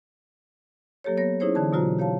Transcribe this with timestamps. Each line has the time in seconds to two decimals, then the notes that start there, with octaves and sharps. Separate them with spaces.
1.04 F#3 A#3 G4 A4 C#5
1.17 B3 C#5 A#6
1.40 C#4 D#4 E4 G#4 C5 C#5
1.55 D3 E3 D5 A5
1.73 B2 F#3 F4 F#4 C5 A#5
1.99 G4 C#5 F5 A5